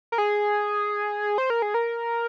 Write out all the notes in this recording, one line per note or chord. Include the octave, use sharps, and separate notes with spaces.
A#4
G#4
C5
A#4
G#4
A#4